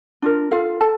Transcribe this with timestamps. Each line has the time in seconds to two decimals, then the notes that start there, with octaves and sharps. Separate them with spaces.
0.22 D4 F4 A#4
0.51 F4 A4 F5
0.81 A4 A5